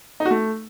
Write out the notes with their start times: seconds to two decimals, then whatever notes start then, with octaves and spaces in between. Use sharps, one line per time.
0.20 D#4
0.25 F#4
0.31 A3